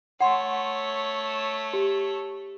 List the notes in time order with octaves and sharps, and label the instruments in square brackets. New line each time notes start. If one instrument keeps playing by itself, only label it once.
[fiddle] A3 C#5 [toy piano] F#5 C6
[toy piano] G4